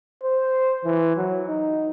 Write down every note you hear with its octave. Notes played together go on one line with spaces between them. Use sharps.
C5
E3
F#3
D#4